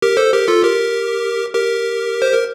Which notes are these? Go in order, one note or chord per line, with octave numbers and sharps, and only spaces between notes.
G4 A#4
A4 C5
G4 A#4
F4 A4
G4 A#4
G4 A#4
C5
A#4